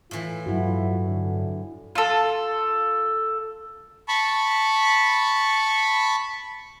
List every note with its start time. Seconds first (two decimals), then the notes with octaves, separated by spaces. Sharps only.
0.11 A2 E3 F4
0.46 G2 F#3 E4 F#4
1.07 D3
1.95 F4 A4
4.08 A5 B5 C#6